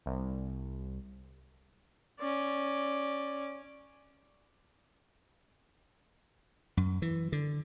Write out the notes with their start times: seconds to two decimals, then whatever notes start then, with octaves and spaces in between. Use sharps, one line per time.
0.06 C2
2.19 C#4 D5
6.77 F#2
7.02 E3
7.32 D3